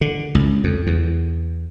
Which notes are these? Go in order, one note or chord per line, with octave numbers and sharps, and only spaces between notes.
D3
C#2
F2
E2